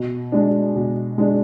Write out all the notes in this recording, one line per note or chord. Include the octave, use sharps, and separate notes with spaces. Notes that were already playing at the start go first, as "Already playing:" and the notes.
Already playing: B2
G#3 D4
B2
G#3 D4